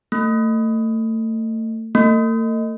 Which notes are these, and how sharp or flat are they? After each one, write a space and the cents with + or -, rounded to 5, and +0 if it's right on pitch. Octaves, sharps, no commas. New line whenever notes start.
A3 +30
A3 +45